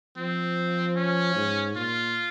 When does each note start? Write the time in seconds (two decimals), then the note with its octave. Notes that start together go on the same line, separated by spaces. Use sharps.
0.17 F3 C4
0.96 C#4
1.36 G#2
1.76 A#2 F4